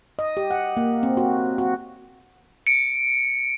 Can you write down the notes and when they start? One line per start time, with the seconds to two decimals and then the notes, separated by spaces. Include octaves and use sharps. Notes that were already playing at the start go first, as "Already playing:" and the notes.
0.19 D#5
0.37 G4
0.51 F#5
0.77 A#3
1.03 C4
1.17 F#4
1.58 F#4
2.67 C#7 D7